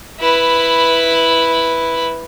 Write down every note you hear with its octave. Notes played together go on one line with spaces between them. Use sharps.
E4 B4